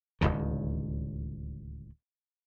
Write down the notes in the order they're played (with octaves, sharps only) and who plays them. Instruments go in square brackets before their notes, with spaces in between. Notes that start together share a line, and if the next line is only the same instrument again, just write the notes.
[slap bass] D1 G1 C#2 D#3